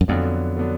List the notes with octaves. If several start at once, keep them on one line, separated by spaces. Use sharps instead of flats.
F#2
F2 D3 F#3 B3 D4
D3 F#3 B3 D4